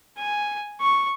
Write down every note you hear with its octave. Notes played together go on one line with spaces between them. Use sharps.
G#5
C#6